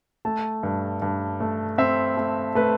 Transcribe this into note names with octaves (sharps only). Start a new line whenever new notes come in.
A3 A5
G2
G2
A3
C4 E5
A3
A3 B4